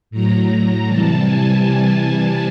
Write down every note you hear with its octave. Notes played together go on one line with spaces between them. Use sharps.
A2 F#3 A#5
A#5
C3 E3 G3 A5
G#5